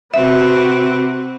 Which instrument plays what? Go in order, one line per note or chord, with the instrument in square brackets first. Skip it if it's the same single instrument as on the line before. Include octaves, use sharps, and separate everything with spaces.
[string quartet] C3 C4 [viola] F#4 B4 [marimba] E5